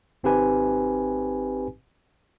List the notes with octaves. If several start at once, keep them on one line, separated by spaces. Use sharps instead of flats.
G#1 C4 D#4 G4 B4 G#5